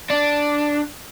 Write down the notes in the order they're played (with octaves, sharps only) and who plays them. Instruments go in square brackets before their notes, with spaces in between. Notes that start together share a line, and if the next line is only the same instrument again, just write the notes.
[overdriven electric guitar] D4